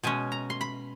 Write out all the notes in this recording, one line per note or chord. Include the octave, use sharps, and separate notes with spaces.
B2 G#3 C#4 G#5
A#5
C6
B5